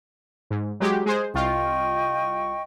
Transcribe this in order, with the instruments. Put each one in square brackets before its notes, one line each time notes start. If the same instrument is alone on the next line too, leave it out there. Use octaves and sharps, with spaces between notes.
[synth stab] G#2
F#3 G#3 G4
G#3 G#4 C5
[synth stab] C2 F4 [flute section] D#5 G5 C#6